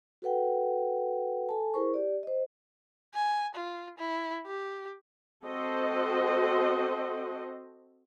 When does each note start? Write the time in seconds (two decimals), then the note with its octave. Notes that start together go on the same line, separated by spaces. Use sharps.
0.22 F#4 A4 B4 F#5 G5
1.49 A4 G#5 A5
1.74 E4 G#4 A#4 C5 C#6
1.94 G4 D5
2.23 C5 D#5
3.14 G#5
3.55 F4
3.98 E4
4.46 G4
5.46 C4 F#4 A4 C5 D#5